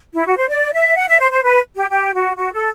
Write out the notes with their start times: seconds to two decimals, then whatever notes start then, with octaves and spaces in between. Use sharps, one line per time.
0.14 E4
0.26 F#4
0.37 C5
0.49 D5
0.73 E5
0.96 F#5
1.08 E5
1.20 C5
1.31 C5
1.43 B4
1.75 G4
1.90 G4
2.14 F#4
2.37 F#4
2.53 A4